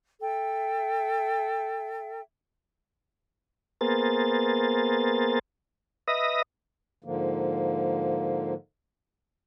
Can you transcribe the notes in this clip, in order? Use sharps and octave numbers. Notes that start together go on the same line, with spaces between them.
A4 E5 G5
A#3 B3 G#4 A#4 C5 A6
B4 D#5 E5 D#6 A#6
G#2 D3 F3 A#3